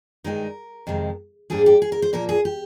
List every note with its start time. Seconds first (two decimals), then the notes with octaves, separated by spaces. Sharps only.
0.24 G2 D#3 G#3 D#4 A#4
0.87 F2 C3 D#3 G#3
1.50 G#2 G3 A#3 D4 G#4
1.66 G4
1.82 G#4
1.92 A#4
2.02 C5
2.13 A#2 F3 A#3 A#4
2.29 G#4
2.45 G4